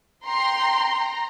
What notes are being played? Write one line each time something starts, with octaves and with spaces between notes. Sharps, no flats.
G5 A#5 C6
A#5